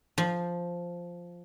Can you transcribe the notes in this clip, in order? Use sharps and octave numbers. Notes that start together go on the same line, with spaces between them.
F3